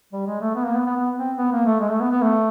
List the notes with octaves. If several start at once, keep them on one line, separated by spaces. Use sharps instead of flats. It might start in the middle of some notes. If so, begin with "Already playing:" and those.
G3
G#3
A3
B3
A#3
B3
B3
B3
C4
B3
A#3
A3
G#3
A3
B3
B3
A3